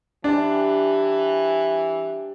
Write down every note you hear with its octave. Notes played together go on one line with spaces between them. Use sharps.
E3 G3 D4 G4 C5